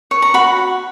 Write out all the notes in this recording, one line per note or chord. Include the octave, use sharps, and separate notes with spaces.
C#5
A#5
F#4 B5